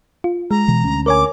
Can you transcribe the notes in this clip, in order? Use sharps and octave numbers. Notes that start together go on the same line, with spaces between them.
F4
G#3 A#5
B2 E3
D2 C#4
A#4 C#5 G#5 D6